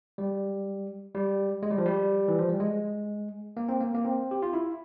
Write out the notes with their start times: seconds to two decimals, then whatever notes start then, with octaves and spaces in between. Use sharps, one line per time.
0.18 G3
1.15 G3
1.63 G#3
1.71 G3
1.78 F3
1.86 G3
2.28 E3
2.39 F3
2.49 G3
2.60 G#3
3.57 A#3
3.69 C4
3.81 A#3
3.95 A#3
4.05 C4
4.31 G4
4.42 F4
4.53 E4